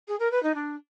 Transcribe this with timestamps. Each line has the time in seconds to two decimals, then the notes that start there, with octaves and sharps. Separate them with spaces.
0.08 G#4
0.19 A#4
0.31 B4
0.43 D#4
0.55 D4